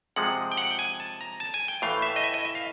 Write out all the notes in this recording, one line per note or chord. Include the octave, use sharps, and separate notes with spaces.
C3 F3 G#3 F#5
G5
F#5
G5
G#5
A5
A#5
A5
G#5
G5
A2 E3 A3 F5
E5
D#5
E5
D#5
E5
F5